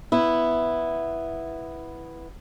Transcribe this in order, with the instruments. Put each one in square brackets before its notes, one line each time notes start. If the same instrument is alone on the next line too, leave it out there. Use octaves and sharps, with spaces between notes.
[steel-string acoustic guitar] B3 E4